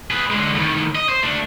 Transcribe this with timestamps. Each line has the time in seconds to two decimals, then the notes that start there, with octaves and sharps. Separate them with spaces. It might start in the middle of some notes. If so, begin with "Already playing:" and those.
0.11 G#4 B4
0.30 D3 G#3
0.55 A2 D#3
0.95 D#5
1.09 C5
1.23 A3 D4